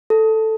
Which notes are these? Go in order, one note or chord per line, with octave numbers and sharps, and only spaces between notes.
A4